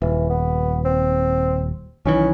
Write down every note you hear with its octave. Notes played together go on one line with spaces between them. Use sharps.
D#1 E3
B3
C4
B1 D#3 E3 C#4